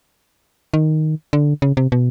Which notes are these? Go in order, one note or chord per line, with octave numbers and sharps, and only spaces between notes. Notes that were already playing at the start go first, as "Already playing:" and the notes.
D#3
D3
C#3
C3
B2